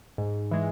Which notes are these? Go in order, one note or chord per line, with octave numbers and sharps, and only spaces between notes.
G#2
E3 G#3